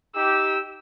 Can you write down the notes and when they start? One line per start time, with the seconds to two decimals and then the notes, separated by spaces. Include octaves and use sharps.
0.15 D#4 G4 E6